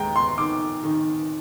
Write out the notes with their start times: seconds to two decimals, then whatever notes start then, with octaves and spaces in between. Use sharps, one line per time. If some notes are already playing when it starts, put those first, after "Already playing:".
Already playing: D#2 G#3 G5 A#5
0.16 C6
0.38 D#3 D6
0.83 D#3